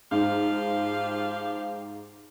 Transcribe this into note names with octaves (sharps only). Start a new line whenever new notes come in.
G#2 F3 G4 F5